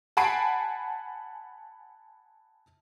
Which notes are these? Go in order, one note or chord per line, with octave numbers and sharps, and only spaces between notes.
F#5 G#5 A5 B5 C7 D7